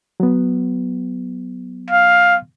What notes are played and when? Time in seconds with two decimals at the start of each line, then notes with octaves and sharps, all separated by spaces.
0.20 F#3 B3
1.91 F5